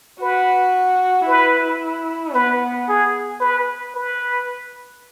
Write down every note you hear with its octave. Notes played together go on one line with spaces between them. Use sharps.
F#4 B4
E4 B4
B3 B4
G#4
B4
B4